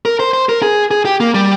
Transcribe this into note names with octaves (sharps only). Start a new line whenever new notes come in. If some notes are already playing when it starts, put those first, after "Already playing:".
A#4
C5
C5
A#4
G#4
G#4
G4
A#3
G3